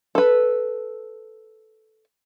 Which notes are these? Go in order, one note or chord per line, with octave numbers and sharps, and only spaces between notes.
A4 B4